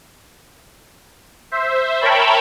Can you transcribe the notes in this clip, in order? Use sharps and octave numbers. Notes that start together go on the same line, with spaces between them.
C5 E5
A#4 C#5 E5 G5 A5 B5